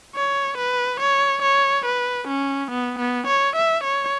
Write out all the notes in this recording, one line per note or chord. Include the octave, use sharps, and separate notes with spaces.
C#5
B4
C#5
C#5
B4
C#4
B3
B3
C#5
E5
C#5